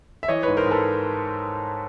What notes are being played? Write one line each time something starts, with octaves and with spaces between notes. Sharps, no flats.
E5
E3 C#5 D#5
G#2 B4 C#5
A#4 C5
G#2
A4 B4